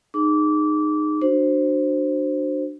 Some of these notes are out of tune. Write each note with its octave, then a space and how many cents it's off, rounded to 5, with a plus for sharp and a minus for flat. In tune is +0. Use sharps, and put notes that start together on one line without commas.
D#4 -20 G#4 +0 D6 -20
D4 +20 F#4 +5 C5 +5